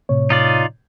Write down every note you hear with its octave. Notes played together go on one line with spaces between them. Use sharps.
A2 C3 C#5
D#4 F4 D5